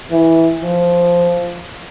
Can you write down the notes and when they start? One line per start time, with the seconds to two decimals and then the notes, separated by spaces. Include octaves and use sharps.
0.11 E3
0.63 F3